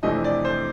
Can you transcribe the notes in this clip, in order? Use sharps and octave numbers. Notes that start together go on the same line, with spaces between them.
F2 C3 E3 A3 D4 D#5
D5
C5